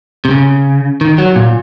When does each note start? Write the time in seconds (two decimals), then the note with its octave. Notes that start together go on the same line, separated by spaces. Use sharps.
0.25 C3
0.31 C#3
1.01 D#3
1.18 F#3
1.36 A#2